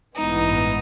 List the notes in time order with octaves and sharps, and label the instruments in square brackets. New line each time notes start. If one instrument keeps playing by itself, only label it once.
[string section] A1 G2 E3 G#3 B3 [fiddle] D#4